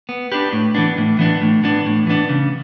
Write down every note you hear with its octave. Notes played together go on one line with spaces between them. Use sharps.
B3
D4 G4 B4
A2
E3 B3 D4
A2
E3 B3 D4
A2
E3 B3 D4
A2
E3 B3 D4
C#3